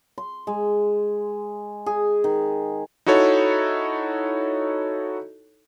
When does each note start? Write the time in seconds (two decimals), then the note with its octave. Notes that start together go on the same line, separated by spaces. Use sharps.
0.18 C6
0.47 G#3
1.86 G#4
2.24 D#3
3.06 D#4 E4 F#4 A4 C#5